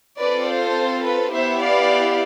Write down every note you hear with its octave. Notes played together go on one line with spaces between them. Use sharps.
C4 F4 A4 B4 D5
C5
B4
B3 E4 G4 C5 E5
D5 F5